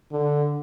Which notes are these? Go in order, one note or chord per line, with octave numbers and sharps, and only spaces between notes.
D3